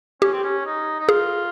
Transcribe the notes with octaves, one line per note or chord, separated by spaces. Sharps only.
C#4 G4
C4
C#4
D#4
D#4
F4 G#4